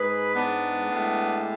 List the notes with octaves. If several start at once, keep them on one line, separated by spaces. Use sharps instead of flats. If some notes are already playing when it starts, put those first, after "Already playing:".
Already playing: G#2 G#3 G#4 B4
B3 D4
A2 G#3